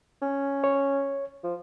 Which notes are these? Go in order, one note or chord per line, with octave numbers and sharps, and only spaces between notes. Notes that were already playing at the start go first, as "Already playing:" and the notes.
C#4
C#5
F3